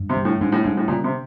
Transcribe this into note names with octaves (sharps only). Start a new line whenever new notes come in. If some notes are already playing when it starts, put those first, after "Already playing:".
Already playing: G2
C3
G3
A2
G#2 G3
A2
G#2 G3
A2
A#2 C#3
C3